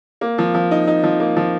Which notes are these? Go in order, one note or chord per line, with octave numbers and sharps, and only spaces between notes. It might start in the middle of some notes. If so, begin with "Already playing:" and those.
A#3
F3
F3
D#4
D#4
F3
A#3
F3